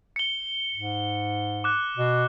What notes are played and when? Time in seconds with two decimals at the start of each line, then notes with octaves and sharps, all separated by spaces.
0.16 C#7 G7
0.75 G#2
1.64 D6 F#6
1.97 B2